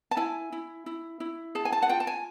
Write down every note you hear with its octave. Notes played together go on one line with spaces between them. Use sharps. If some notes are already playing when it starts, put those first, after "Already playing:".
A5
E4 G#5
E4
E4
E4
G#4 A5
G#5
A5
F#5
F4 G5
A5
G#5